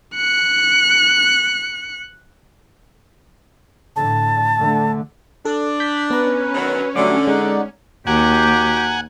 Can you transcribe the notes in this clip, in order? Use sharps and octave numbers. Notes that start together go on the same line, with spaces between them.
F#6 C#7
A2 D3 A5
D3 A3
D4 A4
G6 B6
B3 C#4 B4 A#5
D3 D#3 F#3
D3 F#3 G3 A3 D4 D6
G#3 D#4 D5 F#5
D#2 F#4 G4 F#5 G#5 A#5